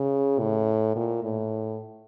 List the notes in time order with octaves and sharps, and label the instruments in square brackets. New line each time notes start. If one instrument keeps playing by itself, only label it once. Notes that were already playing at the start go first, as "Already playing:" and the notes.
Already playing: [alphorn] C#3
A2
A#2
A2